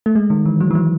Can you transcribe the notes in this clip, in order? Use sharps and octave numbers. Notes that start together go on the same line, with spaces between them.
A3
G#3
D#3
E3
F#3
E3
F#3